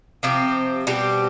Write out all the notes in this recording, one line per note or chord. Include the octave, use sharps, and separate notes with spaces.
C3 F3 C4 G4
B2 G3 C4 G4